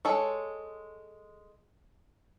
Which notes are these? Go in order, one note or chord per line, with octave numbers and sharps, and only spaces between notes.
G#3 A4 C#5